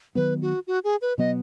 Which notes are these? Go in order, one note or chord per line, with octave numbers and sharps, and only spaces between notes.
D#3 F#3 B3 B4
F#4
F#4
G#4
B4
B2 F#3 B3 D#5